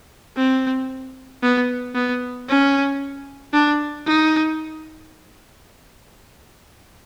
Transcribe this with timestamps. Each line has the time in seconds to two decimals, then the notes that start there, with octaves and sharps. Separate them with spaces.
0.37 C4
1.43 B3
1.95 B3
2.49 C#4
3.53 D4
4.07 D#4